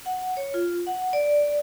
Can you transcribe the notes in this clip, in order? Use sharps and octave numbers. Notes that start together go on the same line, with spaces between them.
F#5
C#5
F4
F#5
D5